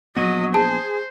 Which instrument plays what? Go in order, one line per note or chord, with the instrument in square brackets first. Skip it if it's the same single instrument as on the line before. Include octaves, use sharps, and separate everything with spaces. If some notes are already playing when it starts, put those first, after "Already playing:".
[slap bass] A#1 B3 [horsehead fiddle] F#3 D#5 [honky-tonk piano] A#6 D#7
[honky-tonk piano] G#4 [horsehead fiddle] C5 [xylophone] A5